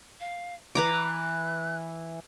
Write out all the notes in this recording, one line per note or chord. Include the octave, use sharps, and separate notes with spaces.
F5
E3 E4 B4 A#5 D6
F#6